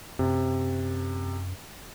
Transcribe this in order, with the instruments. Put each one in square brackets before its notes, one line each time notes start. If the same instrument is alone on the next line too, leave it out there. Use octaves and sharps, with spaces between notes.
[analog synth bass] F#2 [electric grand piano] C3